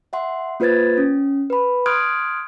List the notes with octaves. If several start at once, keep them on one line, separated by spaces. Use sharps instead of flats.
E5 F#5 C6
A#3 F4 B4 C5 G#6 A6
C#4
B4 B5
C6 D#6 F6 F#6 G#6 D7